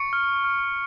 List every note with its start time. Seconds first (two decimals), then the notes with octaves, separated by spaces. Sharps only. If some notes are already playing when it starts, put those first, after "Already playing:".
Already playing: C#6 C#7
0.13 F6
0.44 F6